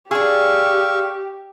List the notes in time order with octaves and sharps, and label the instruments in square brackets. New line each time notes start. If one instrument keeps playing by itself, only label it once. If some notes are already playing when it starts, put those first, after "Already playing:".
[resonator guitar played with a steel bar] D4 G#4 [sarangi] G4 [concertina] F5 C#6 E6